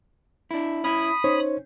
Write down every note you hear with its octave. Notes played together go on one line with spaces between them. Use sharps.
D4 E4
C#4 E4 B5 D#6
C#4 D#4 C5 C#5